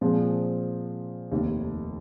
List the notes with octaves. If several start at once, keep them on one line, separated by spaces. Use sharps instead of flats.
A#2 F3 G#3 C4
F1 D#2 D#3